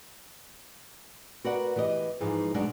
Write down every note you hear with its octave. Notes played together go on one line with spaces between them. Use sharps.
F#4 A#4 B4 D5 F#5
E3 B3 G4 D#5
G#2 E3 F3 G#3
B2 F#3 G#3 D4 F#5 G#5